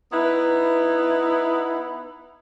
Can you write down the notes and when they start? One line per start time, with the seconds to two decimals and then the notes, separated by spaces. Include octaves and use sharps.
0.11 B3 D#4 E4 B4